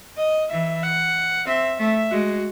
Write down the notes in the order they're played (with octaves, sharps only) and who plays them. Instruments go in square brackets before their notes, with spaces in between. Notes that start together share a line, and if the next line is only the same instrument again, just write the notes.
[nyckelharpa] D#5
[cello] E3 [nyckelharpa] E5
[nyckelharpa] F#5
[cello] C4 [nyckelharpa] E5
[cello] A3 [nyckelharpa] E5
[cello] G#3 [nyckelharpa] F#4